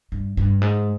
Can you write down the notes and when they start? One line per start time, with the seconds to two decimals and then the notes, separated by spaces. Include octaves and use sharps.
0.12 G2
0.37 G2
0.62 G#2